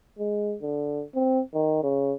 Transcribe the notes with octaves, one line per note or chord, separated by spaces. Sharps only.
G#3
D3
C4
D#3
C#3